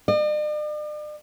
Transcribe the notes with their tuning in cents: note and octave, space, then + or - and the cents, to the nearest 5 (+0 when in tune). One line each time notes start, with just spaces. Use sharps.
D5 +45